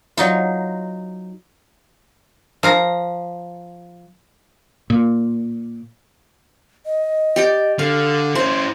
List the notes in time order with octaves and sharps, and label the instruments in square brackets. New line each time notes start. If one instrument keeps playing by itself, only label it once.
[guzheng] F#3 D#4 F4
[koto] F3 F5 A#5
[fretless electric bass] A#2
[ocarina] D#5
[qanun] G4 D5 G5
[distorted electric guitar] D3 [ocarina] A4 [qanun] F5
[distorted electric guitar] C#4 E4 [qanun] C5